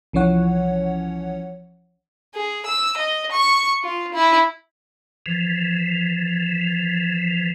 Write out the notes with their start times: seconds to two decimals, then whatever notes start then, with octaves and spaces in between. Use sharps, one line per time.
0.13 C2 E3 F3 C#4 C#5 F#5
2.35 G#4
2.66 E6
2.96 D#5
3.32 C#6
3.83 F4
4.14 E4
5.26 E3 F3